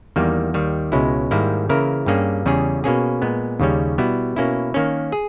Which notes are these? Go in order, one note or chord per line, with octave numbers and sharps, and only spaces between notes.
E2 D#3 G3 A#3
D#2 D#3 G3
C#2 B2 G#3 C#4 E4
G#2 D#3 G3 A#3 E4
C#3 E3 A#3 E4 A#4
G2 G3 A#3 C#4 G#4
E2 C#3 G3 C#4 G#4
B2 A#3 C#4 G#4
A#2 G#3 B3
D#2 C#3 G3 C#4
B2 G3 B3 E4
B2 A#3 C#4 E4
D#3 A#3 C#4
G#4